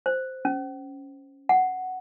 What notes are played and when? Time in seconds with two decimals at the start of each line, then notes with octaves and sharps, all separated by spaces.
0.06 C5
0.45 C#4
1.49 F#5